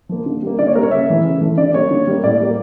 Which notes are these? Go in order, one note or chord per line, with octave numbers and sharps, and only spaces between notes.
F3 A#3
D3
G3 A#3
D3 D5
C#5
G3 A#3 A#4
C#5
C#3 E5
E3 A3
C#3
E3 A3
D3 D5
G3 A#3 C#5
D3
G3 A#3
A2 D5
G3 A#3